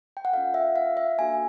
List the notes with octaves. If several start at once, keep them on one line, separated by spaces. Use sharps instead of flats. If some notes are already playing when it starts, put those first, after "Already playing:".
G5
F#5
C#4 F4 A4 F5
E5
F5
E5
A#3 D4 F#4 A4 G#5